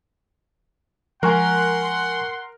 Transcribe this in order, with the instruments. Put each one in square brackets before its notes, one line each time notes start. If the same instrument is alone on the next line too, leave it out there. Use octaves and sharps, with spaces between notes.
[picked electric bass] F3 G#3 [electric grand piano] A#4 [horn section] F#5 C6 [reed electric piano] G#5 C#6 F#6